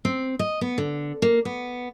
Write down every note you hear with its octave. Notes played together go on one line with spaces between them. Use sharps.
C4
D#5
B3
D3
A#3
B3